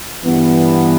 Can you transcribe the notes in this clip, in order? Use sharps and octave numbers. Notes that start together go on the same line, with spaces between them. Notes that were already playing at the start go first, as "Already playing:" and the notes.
G2 E3 B3